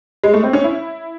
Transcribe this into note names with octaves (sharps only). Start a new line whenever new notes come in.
G#3
A3
C4
C#4
E4